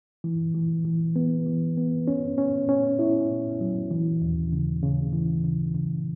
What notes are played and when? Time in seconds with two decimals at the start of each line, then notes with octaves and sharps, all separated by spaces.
0.24 E3
0.54 E3
0.85 E3
1.16 B3
1.46 E3
1.77 B3
2.08 C#4
2.38 C#4
2.69 C#4
2.99 E4
3.29 A#2
3.61 F#3
3.91 E3
4.22 D#2
4.52 C#3
4.83 C#3
5.13 E3
5.44 C#3
5.74 C#3